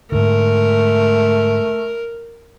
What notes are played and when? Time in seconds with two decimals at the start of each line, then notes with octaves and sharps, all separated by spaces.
0.12 G#2 D3 A3 A#4